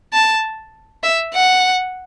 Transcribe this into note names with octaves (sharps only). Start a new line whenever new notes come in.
A5
E5
F#5